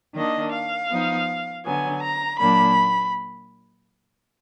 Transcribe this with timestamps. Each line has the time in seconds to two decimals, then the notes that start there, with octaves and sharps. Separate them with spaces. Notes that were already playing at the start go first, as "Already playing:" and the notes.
0.14 D#3 A#3 D4 D#5
0.51 F5
0.90 F3 B3 D#4
1.64 D3 F#3 B3 G#5
2.01 A#5
2.39 A#2 F#3 A#3 D4 B5